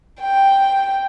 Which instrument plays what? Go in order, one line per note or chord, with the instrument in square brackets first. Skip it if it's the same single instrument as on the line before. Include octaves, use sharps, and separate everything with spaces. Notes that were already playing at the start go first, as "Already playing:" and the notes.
[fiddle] G5